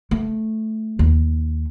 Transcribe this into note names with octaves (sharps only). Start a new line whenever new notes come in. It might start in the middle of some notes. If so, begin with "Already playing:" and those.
A3
D#2